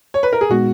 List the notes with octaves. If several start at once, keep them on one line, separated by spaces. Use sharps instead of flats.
C#5
B4
A#4
G#4
A#2 G#3 B3 D#4 F#4